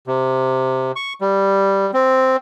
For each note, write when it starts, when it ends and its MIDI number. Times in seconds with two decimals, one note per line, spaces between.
0.07 0.92 48
0.96 1.13 85
1.21 1.91 55
1.94 2.36 60